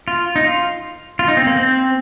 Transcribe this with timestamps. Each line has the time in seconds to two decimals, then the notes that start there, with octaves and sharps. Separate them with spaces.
0.08 F4
0.36 D#4
0.44 F4
1.19 F4
1.28 D#4
1.37 C4
1.47 A#3
1.56 C4